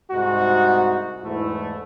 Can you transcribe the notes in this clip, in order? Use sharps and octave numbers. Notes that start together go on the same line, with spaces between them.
C2 G#2 D#4 F#4
E2 G#2 A3 E4